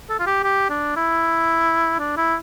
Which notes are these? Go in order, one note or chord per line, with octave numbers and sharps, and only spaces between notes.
A4
F4
G4
G4
D4
E4
D4
E4